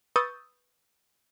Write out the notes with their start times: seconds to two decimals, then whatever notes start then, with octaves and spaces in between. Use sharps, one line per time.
0.16 B4 C#6 D#6 E6 G6 A6